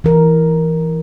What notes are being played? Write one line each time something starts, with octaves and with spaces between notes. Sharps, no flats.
E3 A#4